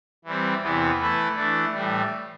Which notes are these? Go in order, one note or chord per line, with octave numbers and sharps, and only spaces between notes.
E3 G3 C4
E2 C3 E3 B3
E3 A3 E4 B4
E3 A3 D4
A2 E3 G3